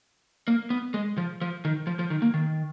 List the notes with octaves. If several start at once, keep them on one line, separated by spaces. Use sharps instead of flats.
A#3
B3
G#3
F3
F3
D#3
F3
F3
D#3
A#3
D#3